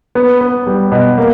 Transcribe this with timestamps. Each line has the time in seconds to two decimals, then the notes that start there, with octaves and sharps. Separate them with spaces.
0.15 B3
0.41 B3
0.67 G3
0.92 B2
1.18 A#3